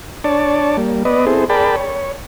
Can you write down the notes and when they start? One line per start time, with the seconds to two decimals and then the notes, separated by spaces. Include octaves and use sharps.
0.24 D4 C#5 D5 A5
0.77 G3 A#3
1.05 B3 B4 D5 D#5
1.27 C4 E4 G#4 A4 C5
1.50 G#4 A#4 D5 G5 A5 B5
1.76 C#5